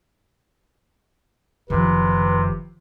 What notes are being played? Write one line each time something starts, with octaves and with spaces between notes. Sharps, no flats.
F#1 C3 D#3 F3 B4